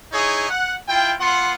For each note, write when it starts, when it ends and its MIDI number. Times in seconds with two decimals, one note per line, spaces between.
0.12 0.45 63
0.12 0.45 64
0.12 0.45 68
0.12 0.45 73
0.50 0.74 78
0.88 1.13 64
0.88 1.13 65
0.88 1.13 79
1.20 1.53 59
1.20 1.53 65
1.20 1.53 78
1.20 1.53 84